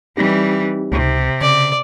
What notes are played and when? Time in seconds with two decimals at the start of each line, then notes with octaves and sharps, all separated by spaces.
0.17 E3 G3 C4 D#4 G4
0.92 C#2 C3
1.41 C#3 D5